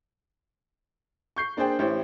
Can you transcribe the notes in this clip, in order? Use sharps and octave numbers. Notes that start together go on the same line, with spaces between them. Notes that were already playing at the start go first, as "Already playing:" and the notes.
C#6 G6 C7
A#3 D4 G#4 C5 D5 G5
A1 E3 E4 G4 C5 C#5